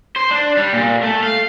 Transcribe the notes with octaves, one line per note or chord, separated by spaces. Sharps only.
C5
D4
G3
A#2
A3
F5